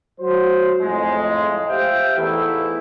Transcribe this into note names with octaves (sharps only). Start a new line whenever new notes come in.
F#3 F#4 C5
F2 A2 G#3
G4 C5 E5 F5 G5
E2 E3 A3 D#4 E4